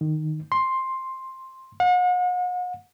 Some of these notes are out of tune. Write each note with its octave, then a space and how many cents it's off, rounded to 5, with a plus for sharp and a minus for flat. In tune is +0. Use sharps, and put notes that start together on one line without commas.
D#3 -10
C6 +10
F#5 -40